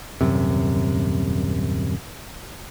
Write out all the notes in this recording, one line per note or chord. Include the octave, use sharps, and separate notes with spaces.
D#1 F#2 C3